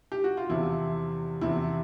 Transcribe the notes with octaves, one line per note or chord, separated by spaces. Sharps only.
G4
F#4
F4
E2 C3 F3 E4
E2 C3 F3 E4